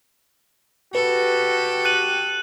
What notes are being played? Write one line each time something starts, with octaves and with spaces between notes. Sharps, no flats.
F#4 G4 A4 B4
F#6 D#7 F#7